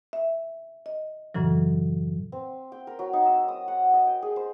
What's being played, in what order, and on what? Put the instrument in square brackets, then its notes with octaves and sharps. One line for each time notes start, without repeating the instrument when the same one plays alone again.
[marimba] E5
D#5
F#2 A2 C#3 E3 F#3
[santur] C4
G5
A#4
F#3
D#4
E6
D#6
F#5
D#5
G5
G#4
C5